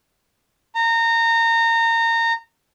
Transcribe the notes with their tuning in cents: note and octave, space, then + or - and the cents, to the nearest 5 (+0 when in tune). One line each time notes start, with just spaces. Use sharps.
A#5 -25